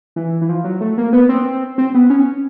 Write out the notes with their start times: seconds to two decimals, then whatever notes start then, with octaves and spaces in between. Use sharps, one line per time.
0.16 E3
0.41 E3
0.49 F3
0.64 F#3
0.81 A3
0.98 A#3
1.13 B3
1.29 C4
1.78 C4
1.94 B3
2.10 C#4